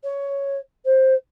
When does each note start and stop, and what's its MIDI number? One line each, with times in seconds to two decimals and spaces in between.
0.03 0.56 73
0.85 1.13 72